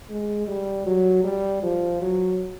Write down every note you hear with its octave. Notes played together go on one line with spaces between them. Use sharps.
G#3
G3
F#3
G3
F3
F#3